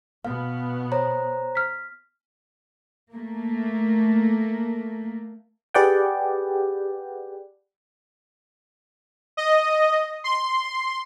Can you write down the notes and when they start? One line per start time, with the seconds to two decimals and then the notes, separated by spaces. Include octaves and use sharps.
0.25 B2 B3 F5
0.92 C5 C#5 A#5
1.55 F6 B6
3.14 A3 A#3
5.74 G4 G#4 B4 D5 F#5 G5
9.37 D#5
10.24 C6